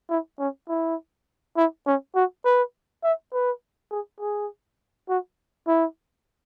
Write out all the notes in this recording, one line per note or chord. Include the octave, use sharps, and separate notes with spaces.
E4
C#4
E4
E4
C#4
F#4
B4
E5
B4
G#4
G#4
F#4
E4